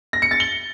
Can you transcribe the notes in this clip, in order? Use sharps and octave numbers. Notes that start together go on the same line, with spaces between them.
A#6
C#7
A6
G7